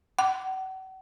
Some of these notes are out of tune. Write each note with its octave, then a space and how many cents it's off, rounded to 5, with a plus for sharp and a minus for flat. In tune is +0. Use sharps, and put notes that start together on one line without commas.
F#5 +40